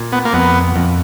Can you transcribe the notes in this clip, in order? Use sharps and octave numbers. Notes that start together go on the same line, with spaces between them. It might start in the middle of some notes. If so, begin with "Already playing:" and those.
Already playing: A#2
B3
A#3
F2 B3
F2